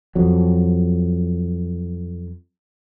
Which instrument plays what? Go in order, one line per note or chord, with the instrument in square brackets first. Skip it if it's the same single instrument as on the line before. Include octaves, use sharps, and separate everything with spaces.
[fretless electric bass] F2 F#3